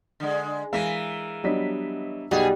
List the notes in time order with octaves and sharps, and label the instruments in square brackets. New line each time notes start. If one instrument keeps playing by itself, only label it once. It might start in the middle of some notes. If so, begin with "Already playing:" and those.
[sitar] D3 G#3
[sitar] E3 A#4 E5 [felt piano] G#3 [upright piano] F5 B6 D#7
[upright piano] F#3 D#5 B6 [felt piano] G3 B3 D4
[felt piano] B1 [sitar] B2 G#4 [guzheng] G3 [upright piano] F#4 D#5 G5